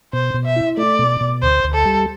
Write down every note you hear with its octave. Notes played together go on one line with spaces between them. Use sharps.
B2 C5
B2
E5
E4
A3 D5
B2
B2
D2 C5
D2
A4
G3